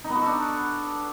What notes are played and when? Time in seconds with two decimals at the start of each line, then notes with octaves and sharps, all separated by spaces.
0.04 D#4
0.10 B3
0.15 F#4
0.21 A4
0.26 D4